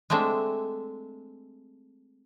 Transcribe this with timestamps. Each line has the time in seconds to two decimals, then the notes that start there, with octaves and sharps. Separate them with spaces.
0.10 G#3 A3 C4 D4 E5